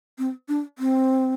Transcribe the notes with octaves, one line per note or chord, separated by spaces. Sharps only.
C4
D4
C4